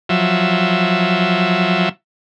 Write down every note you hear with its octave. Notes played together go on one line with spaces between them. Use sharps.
F3 F#3 E5